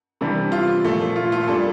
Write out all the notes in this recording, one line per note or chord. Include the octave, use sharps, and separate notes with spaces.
C3 E3 G3 D4
F4
A#2 F3 A3
F4
F4
A#2 G3 D4 A4